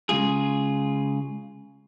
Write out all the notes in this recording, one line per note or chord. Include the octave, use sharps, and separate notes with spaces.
C#3 G#3 F4 G#4